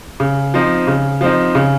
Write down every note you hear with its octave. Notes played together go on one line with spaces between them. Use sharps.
C#3
F3 C4 D#4
C#3
F3 C4 D#4
C#3